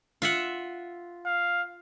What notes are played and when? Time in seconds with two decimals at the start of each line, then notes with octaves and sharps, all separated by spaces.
0.22 F4 E5 F#5
1.26 F5